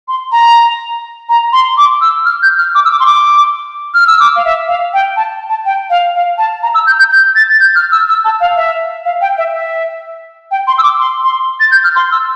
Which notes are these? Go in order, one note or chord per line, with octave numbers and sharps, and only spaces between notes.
C6
A#5
A#5
C6
D6
E6
F6
G6
F6
D6
E6
D6
C6
D6
F6
E6
D6
F5
E5
F5
G5
A5
A5
G5
F5
F5
A5
A#5
E6
G6
G6
G6
A6
A6
G6
F6
E6
E6
A5
F5
E5
F5
G5
E5
E5
G5
C6
E6
D6
C6
C6
A6
G6
F6
C6
E6